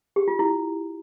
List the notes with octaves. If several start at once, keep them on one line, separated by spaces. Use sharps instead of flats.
G4
F4
E4